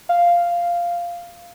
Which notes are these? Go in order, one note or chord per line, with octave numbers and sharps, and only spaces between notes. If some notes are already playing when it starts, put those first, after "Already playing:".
F5